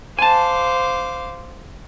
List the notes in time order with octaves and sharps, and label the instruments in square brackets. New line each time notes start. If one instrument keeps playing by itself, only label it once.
[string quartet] C5 F5 D6 [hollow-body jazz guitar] G#5 A5